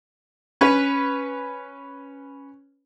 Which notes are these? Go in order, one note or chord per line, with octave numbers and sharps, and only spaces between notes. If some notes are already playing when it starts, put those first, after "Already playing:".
C#4 B4